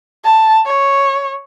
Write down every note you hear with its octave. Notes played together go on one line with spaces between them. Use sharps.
A5
C#5